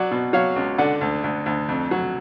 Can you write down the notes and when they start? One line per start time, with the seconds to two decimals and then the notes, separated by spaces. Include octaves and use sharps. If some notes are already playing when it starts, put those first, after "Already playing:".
Already playing: F#3 D5 F#5
0.11 B2
0.33 F#3 C#5 F5
0.56 C#2
0.78 D3 D5 F#5
1.01 D2
1.24 D2
1.46 D2
1.69 F2
1.91 F#3